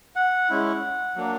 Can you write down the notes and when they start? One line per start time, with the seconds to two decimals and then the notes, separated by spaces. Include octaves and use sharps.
0.16 F#5
0.50 G#3 C#4 E4
1.16 F#3 A#3 D4